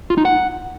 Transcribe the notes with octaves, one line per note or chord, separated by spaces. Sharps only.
F4
D#4
F#5